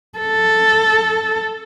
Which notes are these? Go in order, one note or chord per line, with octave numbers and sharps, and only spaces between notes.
A4